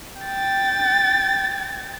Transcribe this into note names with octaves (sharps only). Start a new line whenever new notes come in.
G5 A6